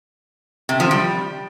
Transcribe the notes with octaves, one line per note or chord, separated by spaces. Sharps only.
C3
F3
G3